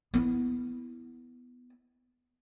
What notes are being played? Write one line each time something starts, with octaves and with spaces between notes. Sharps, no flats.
B3 E4